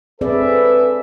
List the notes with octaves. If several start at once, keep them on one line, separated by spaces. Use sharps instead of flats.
C4 G#4 A4 B4 D5 E5